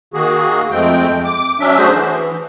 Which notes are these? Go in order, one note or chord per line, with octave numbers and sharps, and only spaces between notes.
D#3 A#3 F#4 G#4
F2 G#3 A3 C4 G5
D6
F#3 C#4 D4 E5
A3 D4 F#4 G#4 C5
E3